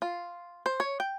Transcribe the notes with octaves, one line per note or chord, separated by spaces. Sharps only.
F4
C5
C#5
G5